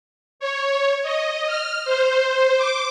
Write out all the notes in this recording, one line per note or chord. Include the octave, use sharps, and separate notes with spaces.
C#5
D#5
F6
C5
D6